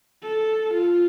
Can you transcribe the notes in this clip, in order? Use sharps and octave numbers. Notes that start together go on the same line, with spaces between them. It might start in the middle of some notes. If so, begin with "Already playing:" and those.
A4
F4